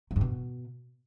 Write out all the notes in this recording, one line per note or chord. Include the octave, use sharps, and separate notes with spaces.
F#3
G2
B2